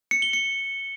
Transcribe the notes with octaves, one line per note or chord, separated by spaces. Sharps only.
C#7
G7
C#7